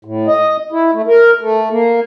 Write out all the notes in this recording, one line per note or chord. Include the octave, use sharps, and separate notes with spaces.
A2
D#5
E4
A3
A#4
A3
A#3